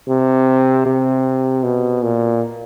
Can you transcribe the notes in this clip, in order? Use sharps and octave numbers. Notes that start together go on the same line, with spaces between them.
C3
C3
B2
A#2